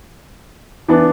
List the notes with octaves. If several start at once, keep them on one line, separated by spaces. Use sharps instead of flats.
E3 B3 D4